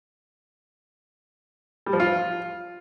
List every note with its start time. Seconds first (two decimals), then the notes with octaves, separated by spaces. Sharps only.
1.86 G3
1.93 F3
2.00 F4